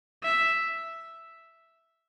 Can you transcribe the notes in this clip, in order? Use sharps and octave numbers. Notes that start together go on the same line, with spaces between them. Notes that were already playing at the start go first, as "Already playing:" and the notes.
E5